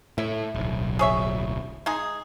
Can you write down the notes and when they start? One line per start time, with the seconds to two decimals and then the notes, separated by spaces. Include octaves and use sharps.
0.18 A2 E5
0.55 D1 B1
0.99 G#4 C#5 E5
1.86 G#3 D#4 G#4